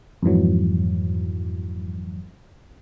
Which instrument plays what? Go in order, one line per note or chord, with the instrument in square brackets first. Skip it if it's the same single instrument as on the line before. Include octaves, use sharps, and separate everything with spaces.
[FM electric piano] F2 G#2 E3 F#3